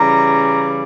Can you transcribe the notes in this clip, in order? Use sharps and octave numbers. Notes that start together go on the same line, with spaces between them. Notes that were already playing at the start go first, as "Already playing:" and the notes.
Already playing: C#3 E3 G3 A#5